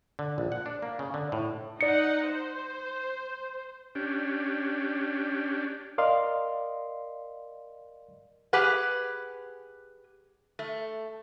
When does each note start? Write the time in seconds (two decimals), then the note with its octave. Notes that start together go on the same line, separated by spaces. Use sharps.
0.19 D3
0.38 A#1
0.52 F#5
0.66 D4
0.82 A#3
0.99 C#3
1.14 D3
1.32 A2
1.81 D#4 D5 F#5 C#7
2.26 C5
3.95 C#4 D4 G4
5.98 A#4 D5 D#5 F5 C6
8.53 G4 G#4 B4 F#5
10.59 A3